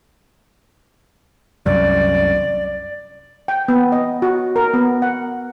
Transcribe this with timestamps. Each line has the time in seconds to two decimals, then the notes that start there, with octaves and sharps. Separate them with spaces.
1.66 C2 F#2 D5
3.48 G5
3.68 B3
3.92 D#5
4.22 F#4
4.56 A#4
4.74 B3
5.02 F#5